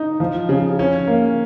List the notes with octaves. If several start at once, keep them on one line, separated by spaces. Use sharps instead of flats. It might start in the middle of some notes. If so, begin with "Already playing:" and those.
Already playing: D#4
F3
C#3
C#4
A#3